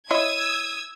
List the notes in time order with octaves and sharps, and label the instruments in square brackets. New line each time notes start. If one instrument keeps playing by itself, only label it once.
[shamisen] E4 C#5 D#5 [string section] D#6 E6 G#6